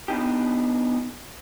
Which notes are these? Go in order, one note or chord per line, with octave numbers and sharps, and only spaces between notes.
B3 D4 D#4 G4